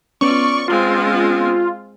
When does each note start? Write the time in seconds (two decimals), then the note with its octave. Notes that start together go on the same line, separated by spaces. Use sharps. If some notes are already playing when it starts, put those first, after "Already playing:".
0.21 B3 C#4 F4 D5 C#6
0.68 G#3 C4 F4